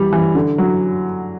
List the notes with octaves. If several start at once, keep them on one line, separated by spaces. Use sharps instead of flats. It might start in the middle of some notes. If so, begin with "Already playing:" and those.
Already playing: E3 G3
E3
D3
F#3